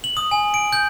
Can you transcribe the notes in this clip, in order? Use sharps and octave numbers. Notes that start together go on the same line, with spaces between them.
F#7
D#6
G#5
D7
G6